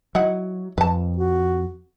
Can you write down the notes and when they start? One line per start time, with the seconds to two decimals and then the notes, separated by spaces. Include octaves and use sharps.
0.15 F#3 D#4 E4 F#5
0.78 F2 B4 A5
1.17 F#4